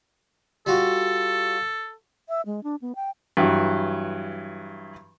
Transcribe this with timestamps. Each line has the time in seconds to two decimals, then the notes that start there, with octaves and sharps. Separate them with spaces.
0.66 G3 F4 F#4 A4
2.29 E5
2.46 G#3
2.64 D4
2.82 B3
2.96 G5
3.37 G2 E3 F#3